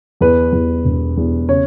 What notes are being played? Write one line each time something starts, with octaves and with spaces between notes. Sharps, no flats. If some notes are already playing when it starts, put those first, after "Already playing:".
E2 B4
E2
E1
E2
C#3 C#5